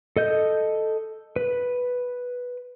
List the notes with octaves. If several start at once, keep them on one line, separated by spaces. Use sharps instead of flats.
A4 D#5 G6
B4